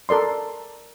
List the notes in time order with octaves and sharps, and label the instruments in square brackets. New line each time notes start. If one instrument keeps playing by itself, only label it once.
[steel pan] A4 A#4 D5 C6